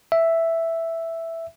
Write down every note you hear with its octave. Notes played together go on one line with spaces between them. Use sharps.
E5